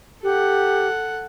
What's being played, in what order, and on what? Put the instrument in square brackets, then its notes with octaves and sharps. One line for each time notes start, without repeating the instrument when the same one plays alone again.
[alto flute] G4 [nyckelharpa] A4 F#5